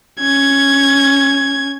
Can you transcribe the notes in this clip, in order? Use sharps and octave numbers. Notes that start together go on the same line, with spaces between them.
C#4 G#6